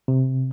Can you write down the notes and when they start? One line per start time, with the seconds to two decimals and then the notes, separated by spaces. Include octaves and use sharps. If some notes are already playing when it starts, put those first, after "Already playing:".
0.08 C3